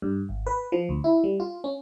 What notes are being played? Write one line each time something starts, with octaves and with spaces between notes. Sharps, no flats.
G2
G#1
B4
F3
D2
E4
G3
F4
C#4